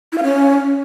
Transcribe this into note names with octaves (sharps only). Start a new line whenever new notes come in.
E4
F5
C#4